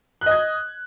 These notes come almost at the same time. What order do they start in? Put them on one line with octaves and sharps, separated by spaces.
F#6 D#5 G#6